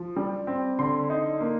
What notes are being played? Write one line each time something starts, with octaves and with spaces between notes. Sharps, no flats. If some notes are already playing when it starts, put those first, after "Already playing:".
Already playing: F3
G3
C4
D3 C6
D#4
A#3